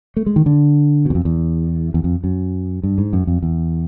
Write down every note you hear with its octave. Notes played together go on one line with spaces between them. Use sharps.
A3
G#3
D#3
D3
E2 B2
F2
E2
E2
F2
F#2
G2
G#2
F#2
F2
E2